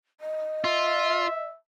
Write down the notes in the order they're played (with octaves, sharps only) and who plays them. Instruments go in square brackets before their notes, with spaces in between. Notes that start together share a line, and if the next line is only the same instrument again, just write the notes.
[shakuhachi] D#5
[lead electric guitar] F4 [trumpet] E5